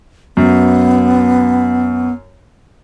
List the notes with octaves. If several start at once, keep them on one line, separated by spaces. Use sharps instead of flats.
F#2 B3